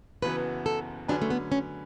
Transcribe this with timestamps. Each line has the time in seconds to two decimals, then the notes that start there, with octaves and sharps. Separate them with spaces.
0.22 F#1 F#2 E3 B3 F#4 B4
0.66 A4
1.08 D3 F#3 C#4 D4 G#4 B4
1.22 A3
1.30 B3
1.52 C#4